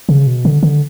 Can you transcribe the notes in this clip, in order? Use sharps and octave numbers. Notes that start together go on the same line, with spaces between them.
C#3
B2
D3
D3